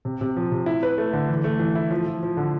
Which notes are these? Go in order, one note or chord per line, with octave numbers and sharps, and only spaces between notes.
C3
C3
F3
C3
E4
B4
A3
D3
E3
A3
E3
E4
F3
F3
F3
D3